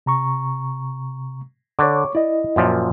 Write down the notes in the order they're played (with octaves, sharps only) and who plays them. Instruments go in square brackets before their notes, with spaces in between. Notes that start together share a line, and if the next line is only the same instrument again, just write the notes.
[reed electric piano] C3 A#5 C#6
[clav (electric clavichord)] D3 [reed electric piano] C#5 C#6 D6
[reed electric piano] E4 D#5 [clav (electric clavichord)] D5
[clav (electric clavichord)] F#2 A#2 F3